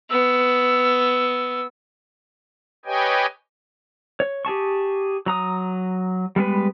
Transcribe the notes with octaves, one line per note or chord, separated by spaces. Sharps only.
B3 E6
G4 B4 C#5 D#5 G5 G#5
C#5
G4 G#4 A5 C#6
F#3 A#5 D#6
G3 G#3 B3 B4